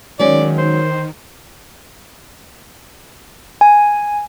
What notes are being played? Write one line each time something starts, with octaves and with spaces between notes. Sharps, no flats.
D#3 F#3 G#3 C#4 D5
C5
G#5